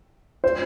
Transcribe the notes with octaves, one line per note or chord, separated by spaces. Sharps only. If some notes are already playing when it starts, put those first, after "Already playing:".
C5